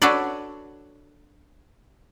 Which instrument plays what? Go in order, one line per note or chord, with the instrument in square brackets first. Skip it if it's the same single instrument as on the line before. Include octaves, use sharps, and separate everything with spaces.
[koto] D4 F#4 A4 B4 C#5 D5